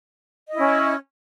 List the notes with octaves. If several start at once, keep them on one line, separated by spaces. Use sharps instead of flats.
C#4 E4 D#5